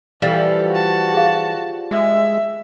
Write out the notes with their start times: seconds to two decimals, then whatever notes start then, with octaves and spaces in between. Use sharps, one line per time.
0.22 E3 F3 G3 A4
0.72 F#4 A5
1.14 G#4 F5
1.91 G#3 E5